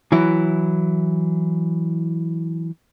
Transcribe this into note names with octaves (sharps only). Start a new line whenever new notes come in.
E3 F#3 E4